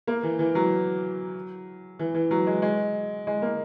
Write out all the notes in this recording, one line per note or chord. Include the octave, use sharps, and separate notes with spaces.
A#3
E3
E3
F#3
E3
E3
F#3
G#3
G#3
G#3
A#3